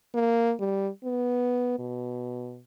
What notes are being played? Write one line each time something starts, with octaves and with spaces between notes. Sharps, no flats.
A#3
G3
B3
B2